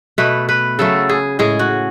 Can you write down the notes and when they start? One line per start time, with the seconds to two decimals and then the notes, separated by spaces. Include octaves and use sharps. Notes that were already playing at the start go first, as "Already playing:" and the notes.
0.18 B2 A3 B4
0.49 B4
0.79 C#3 F#3 A3 A4
1.09 G#4
1.39 A2 G#3 G#4
1.59 F#4